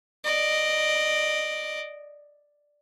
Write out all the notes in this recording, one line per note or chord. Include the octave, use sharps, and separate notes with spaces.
D5 D#5